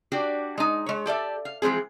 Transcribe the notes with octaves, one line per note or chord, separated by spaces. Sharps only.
D4 F#4 G4 D5
G#3 D#4
G#3 C#5
G4 A4 D5 E5
F5
E3 F3 G#3 C4 G#4